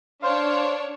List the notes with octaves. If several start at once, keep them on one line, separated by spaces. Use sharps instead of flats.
D4 C5 C#5 F5